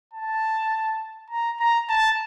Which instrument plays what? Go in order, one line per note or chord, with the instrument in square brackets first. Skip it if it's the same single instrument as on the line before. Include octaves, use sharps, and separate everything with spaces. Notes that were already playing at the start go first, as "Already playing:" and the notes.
[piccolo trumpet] A5
A#5
A#5
A5